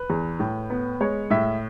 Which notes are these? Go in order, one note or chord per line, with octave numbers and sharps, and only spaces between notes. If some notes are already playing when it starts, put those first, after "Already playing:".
Already playing: B4
E2
A2
B3
G#3 C#5
A2 E5